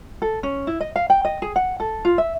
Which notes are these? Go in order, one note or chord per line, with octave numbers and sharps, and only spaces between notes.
A4
C#4
E4
D#5
F5
G5
D#5
G#4
F#5
A4
F4
E5